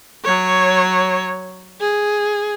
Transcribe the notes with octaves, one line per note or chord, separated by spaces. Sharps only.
F#3 C#5
G#4